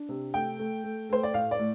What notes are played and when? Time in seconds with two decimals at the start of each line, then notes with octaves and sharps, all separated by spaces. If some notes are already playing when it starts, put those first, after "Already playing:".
Already playing: D4
0.09 C3
0.34 A3 G5
0.59 A3
0.84 A3
1.10 A3 C5
1.23 D5
1.34 A2 F5
1.51 D5
1.59 A2